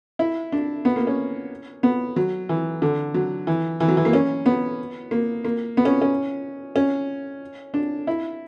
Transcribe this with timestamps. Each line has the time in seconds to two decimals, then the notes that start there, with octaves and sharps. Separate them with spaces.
0.19 E4
0.52 D4
0.85 B3
0.96 A#3
1.07 C#4
1.83 B3
2.16 F#3
2.49 E3
2.82 D3
3.14 F#3
3.47 E3
3.80 E3
3.88 F#3
3.97 E3
4.05 A#3
4.13 C#4
4.46 B3
5.11 A#3
5.45 A#3
5.77 B3
5.85 C#4
6.02 C#4
6.76 C#4
7.74 D4
8.07 E4